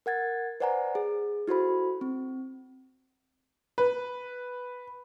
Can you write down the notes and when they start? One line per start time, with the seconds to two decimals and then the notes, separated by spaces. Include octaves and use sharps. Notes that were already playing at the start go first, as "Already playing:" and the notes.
0.06 A#4 F#5 G#6 A6
0.60 B4 C5 D5 F#5 G#5 A#5
0.95 G#4
1.48 E4 F#4 A4 C5 B5
2.01 C4
3.78 B4